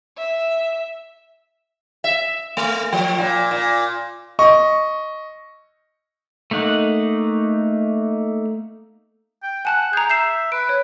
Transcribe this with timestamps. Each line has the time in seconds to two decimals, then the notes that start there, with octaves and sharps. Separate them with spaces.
0.18 E5
2.04 E5
2.57 A3
2.92 F3
3.19 A#2
3.51 A#2
4.39 D#5 C#6
6.51 A3 A#3 D#4 F#5
9.43 G5
9.65 F#5 G#5 A5 F#6
9.93 G#4 A#5 G6
10.10 E5 G6 C7 E7
10.52 B4 D7
10.69 C#5